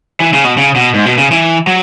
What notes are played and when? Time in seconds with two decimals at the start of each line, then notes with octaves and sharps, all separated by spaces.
0.20 E3
0.33 C#3
0.44 B2
0.57 C#3
0.76 B2
0.94 G#2
1.06 B2
1.18 C#3
1.31 E3
1.67 F#3